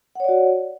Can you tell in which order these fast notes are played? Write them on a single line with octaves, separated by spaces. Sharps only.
F#5 C#5 D5 F#4